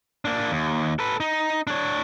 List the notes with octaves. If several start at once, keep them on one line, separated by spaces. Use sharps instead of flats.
A#3 D4
D#2
A4 B4
D#4
D4 C#5